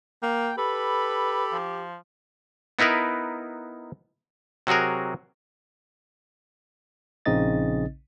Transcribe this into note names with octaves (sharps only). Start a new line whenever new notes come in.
A#3 G5
G4 A4 B4 B5
F3
B3 D#4 E4 A#4 B4
C3 F#3 F#4 G#4 A#4
A#1 C#3 C4 D#4 D#5 A6